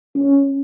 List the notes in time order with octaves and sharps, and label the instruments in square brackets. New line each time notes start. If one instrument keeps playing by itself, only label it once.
[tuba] C#4